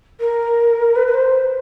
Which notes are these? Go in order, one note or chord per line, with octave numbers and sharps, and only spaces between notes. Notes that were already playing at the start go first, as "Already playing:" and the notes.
A#4
B4
B4
C5